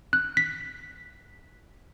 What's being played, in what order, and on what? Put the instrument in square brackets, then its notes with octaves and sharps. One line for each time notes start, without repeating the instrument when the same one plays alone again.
[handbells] F#6
B6